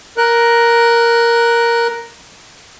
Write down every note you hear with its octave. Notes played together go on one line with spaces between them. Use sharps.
A#4 F#6